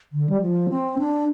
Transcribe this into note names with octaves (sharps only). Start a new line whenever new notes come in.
D3
G3
F3
C4
D4